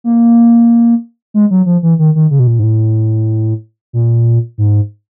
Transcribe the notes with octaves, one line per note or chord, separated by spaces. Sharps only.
A#3
G#3
F#3
F3
E3
D#3
D#3
C#3
B2
A#2
G#2
A2
A#2
G#2